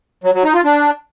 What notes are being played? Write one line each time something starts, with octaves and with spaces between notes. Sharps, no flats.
F#3
F#3
D#4
F4
D4